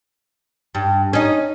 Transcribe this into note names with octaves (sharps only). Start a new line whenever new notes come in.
G2
C#4 D#4